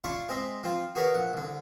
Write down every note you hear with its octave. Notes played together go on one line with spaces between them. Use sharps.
D4 E4 F4 D5 C#6
G#3 C4 D#5 E5
F3 C4 F4
F#4 G#4 A#4 B4 C#5 D5
A#1 F#5
C2 D3